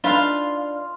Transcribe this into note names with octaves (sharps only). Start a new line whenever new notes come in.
D4 D#4 F4 B4 F5